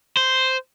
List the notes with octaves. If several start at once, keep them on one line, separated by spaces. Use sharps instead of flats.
C5